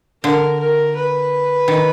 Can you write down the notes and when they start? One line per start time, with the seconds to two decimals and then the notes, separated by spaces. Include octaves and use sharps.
0.23 D3 A#4
0.59 A#4
0.96 B4
1.68 D#3